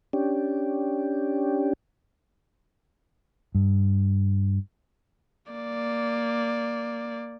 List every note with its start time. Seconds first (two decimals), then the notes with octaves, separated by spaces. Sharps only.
0.13 C#4 D4 G4
3.55 G2
5.52 A#3 D5